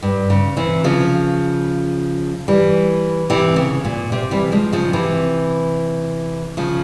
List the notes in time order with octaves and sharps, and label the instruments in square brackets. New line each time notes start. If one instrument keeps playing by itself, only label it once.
[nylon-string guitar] G2
C#3
C3 E3
C#3 F3
E3 G3
C3 E3
C#3
A#2
C3
E3 G3
F3 G#3
C#3 F3
C3 E3
C#3 F3